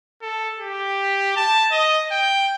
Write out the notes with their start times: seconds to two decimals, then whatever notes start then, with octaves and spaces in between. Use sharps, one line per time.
0.22 A4
0.59 G4
1.36 A5
1.71 D#5
2.12 G5